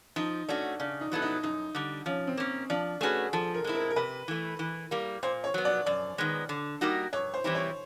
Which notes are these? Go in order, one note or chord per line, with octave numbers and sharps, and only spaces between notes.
F3 D#4
A3 C#4 D4 F#4
C#3 D4
D#4
F#3 B3 E4 A4
D#4
F#2 D#4
D3 G3
F3 C#4
C4
A#3 C#4
F3 D4
A3 C#4 F#4 G#4 B4
F3 A4
A#4
G#3 C4 E4
A#4
A#4
C3 B4
E3 A3
E3
G3 A#3
A#2 C5
C#5
F#3 B3
D5
F#2 D5
D#3 G#3 B3
D3
G3 A#3 D#4 F#4
G2 C#5
C5
E3 G3 C4 E4
C#5